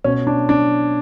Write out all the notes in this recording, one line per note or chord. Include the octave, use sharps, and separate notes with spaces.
B2 C#4
D4
D4